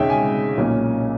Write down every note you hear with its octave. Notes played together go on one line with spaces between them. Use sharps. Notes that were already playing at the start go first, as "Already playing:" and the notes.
Already playing: E1 E2 C#3 G#3 D#4 C#5 E5 G5
G#5
B1 A#2 A#3 C#4